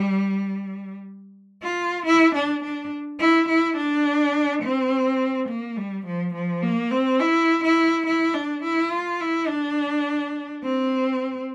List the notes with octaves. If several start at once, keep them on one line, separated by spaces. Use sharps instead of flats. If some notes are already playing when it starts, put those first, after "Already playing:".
Already playing: G3
F4
E4
D4
D4
E4
E4
D4
C4
A#3
G3
F3
F3
A#3
C4
E4
E4
E4
D4
E4
F4
E4
D4
C4